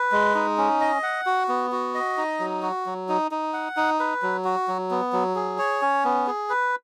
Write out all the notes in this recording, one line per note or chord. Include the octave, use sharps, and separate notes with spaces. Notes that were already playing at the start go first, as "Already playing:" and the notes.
Already playing: B4
G#3
D#4
C#4
D#5
F#5
F#4
B3
F#4
D#5
D#4
F#3
F#4
F#3
D#4
D#4
F#5
D#4
B4
F#3
F#4
F#3
B3
F#3
G#4
C#5
C#4
B3
G#4
B4